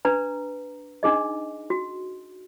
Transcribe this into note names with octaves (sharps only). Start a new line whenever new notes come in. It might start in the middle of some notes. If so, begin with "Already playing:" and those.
D4 B4 A#5
D4 D#4 G#4 D#5
F#4